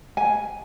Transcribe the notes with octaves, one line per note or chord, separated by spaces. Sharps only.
G#5